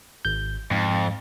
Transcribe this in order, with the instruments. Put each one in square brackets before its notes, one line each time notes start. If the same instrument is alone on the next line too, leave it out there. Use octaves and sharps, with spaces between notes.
[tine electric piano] G#1 G6
[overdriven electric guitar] F2 [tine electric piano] G#2